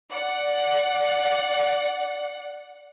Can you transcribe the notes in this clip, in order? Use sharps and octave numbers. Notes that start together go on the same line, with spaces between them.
D5 F#5